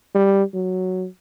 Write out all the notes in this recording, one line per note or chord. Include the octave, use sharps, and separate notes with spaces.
G3
F#3